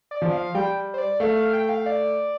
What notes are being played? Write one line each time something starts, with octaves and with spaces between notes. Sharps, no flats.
D5
F3
F5
G3 G5
C5
D5
A3 F5
F5
G5
F5
D5